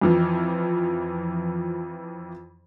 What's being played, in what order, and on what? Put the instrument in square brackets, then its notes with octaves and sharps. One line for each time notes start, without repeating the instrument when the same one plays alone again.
[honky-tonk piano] F2 E3 F3